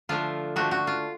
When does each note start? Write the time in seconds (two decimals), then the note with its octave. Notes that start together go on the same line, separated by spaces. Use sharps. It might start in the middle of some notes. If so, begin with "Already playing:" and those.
0.09 D3 F3 A3 D4 F4
0.56 D3 F3 A3 D4 F#4
0.71 F#4
0.87 F4